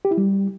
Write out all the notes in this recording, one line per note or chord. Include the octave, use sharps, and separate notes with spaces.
G4
E4
G3